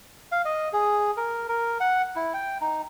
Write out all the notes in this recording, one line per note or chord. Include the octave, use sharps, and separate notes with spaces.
F5
D#5
G#4
A#4
A#4
F#5
E4
G5
D#4